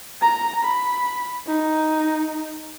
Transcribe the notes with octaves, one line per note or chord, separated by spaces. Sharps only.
A#5
B5
D#4